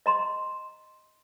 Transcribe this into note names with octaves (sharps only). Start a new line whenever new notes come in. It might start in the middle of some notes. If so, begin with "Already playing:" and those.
D#5 A#5 C6